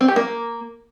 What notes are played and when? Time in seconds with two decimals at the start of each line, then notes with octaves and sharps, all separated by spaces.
0.01 C4
0.08 G4
0.16 A#3